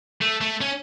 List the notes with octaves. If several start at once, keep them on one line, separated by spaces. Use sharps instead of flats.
A3
A3
C#4